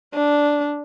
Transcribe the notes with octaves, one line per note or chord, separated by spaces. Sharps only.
D4